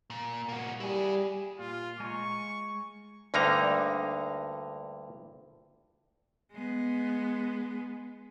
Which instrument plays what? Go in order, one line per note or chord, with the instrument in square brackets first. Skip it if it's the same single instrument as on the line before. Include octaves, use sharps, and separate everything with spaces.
[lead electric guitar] A#2
A#3 F#4
[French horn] G3 [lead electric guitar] E4 G#4
[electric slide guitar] A#2 A#3 [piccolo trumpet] F4
[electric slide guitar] G#3 G#5 A#5 [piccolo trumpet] C#6
[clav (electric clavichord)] D2 G2 D3 A#3 D#4 A#5
[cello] G#3 B3